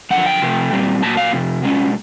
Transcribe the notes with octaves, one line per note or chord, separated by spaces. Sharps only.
F#2 D3 F3 F#5
G5
C3 F3 A3
A#2 G3 C4
A#2 F#3 A#3 A5
F5
F2 C3
B2 G#3 C#4